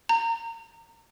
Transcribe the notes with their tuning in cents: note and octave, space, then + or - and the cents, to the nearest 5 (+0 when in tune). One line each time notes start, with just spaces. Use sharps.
A#5 -25